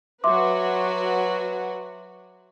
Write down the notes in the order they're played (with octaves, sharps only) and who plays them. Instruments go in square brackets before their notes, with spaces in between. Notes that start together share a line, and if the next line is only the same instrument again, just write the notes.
[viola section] F#3 F#4 B4 [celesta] E5 C6 D6